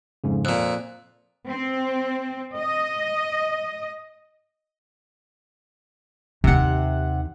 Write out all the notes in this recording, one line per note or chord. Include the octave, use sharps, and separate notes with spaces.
F2 G#2 C#3
F2 A#2 F#6
C4
D#5
D#2 C3 D#3 F#5